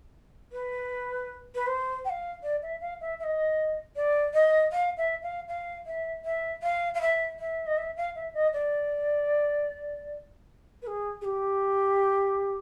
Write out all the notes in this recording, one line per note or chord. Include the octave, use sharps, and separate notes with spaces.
B4
B4
C5
G5
F5
D5
E5
F5
E5
E5
D#5
D5
D#5
F5
E5
F5
F5
E5
E5
F5
F5
E5
E5
D#5
E5
F5
E5
D#5
D5
B4
G#4
G#4
G4